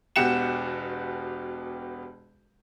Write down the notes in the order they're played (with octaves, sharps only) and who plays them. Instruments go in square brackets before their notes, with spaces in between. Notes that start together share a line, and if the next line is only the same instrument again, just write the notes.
[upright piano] E1 B2 F#4 G4 C#7 E7